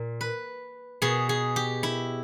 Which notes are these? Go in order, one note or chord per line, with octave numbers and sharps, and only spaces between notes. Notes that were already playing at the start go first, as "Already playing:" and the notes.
Already playing: A#2
B4
B2 G#4
G#4
G4
E4